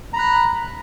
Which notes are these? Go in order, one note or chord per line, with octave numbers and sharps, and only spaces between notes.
A#5 B5 F#6